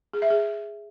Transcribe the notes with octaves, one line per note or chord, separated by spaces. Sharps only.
G#4
E5
G#4